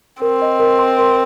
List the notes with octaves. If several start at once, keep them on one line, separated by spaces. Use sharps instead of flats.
C4 A#4
D#5
A#4
C6
A#4